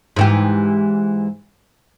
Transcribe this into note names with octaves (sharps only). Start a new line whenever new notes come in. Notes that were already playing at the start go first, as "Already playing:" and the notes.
G#2 E3 G4